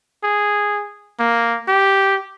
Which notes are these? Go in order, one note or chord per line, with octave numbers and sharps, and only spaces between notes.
G#4
A#3
G4